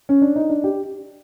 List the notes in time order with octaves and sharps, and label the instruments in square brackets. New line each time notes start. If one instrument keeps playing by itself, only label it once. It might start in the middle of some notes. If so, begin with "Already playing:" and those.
[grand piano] C#4
D4
D#4
D4
G4